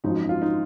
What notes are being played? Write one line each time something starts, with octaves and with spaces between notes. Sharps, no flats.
G#1 F#2 F3 D#4
F4
D#4